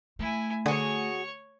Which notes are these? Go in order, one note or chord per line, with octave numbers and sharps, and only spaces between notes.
A3 E4 G#5
D3 F#4 G#4 C#5 C#6